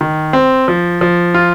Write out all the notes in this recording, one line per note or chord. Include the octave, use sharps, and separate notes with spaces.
D#3
C4
F3
F3
F4